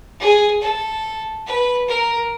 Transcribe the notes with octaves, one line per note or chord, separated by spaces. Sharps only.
G#4
A4
B4
A#4